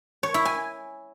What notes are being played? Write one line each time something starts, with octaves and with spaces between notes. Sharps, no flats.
C#5
E4
G#5